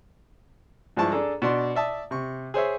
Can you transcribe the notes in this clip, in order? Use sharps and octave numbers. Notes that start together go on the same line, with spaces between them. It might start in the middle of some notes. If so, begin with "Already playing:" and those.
G2 F3 G#3 E4 A5 C#6
D4 G#4 A4 A#5
B2 D4 C6
D5 E5 A5 D#6
C3 C#6
G#4 C5 C#5 E5